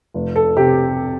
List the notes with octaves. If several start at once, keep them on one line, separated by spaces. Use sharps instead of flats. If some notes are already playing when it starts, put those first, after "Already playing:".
F1
A4
C3 G4